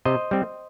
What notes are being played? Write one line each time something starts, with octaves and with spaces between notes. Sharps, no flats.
C3 C5 D#5
G3 C4